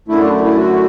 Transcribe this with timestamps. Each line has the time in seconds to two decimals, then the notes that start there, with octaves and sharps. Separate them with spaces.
0.08 F#2 D3 A3 E4
0.20 D4
0.33 E4
0.45 E4
0.56 F#4